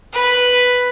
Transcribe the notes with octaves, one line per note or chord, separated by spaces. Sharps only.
B4